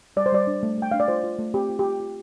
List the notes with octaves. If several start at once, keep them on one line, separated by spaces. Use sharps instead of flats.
G3 D5
C5
G3 D5
D4
A3
A3 G5
D4 F5
D5
F4 C5
F4
A3
C4 G4
F4
F4 G4
F4